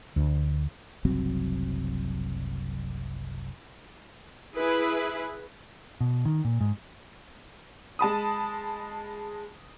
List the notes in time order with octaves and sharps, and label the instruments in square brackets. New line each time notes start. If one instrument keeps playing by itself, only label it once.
[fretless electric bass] D2
[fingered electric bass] F#1 C2 F#3 C4
[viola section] E4 G#4 B4
[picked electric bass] B2
D#3
A#2
G#2
[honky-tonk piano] G#3 A5 B5 D#6